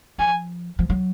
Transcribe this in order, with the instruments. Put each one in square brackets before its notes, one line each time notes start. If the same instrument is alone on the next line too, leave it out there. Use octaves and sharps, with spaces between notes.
[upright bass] F3 [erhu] G#5
[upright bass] F3
F#3